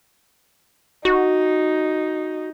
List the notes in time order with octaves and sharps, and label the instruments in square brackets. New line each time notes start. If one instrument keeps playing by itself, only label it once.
[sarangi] D#4 [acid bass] F#4